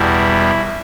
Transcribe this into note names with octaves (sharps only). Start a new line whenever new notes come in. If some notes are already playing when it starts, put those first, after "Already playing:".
Already playing: E2 B2 G3 E4